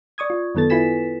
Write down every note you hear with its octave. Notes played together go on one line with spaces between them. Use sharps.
D5 C#6 D#6 G#6
F4
F#2 D#3 B3 A4 A6
E4 F4 B4 G#5 B6 E7